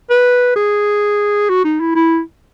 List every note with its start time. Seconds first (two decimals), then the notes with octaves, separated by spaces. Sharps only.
0.10 B4
0.56 G#4
1.50 F#4
1.64 D#4
1.80 E4
1.95 E4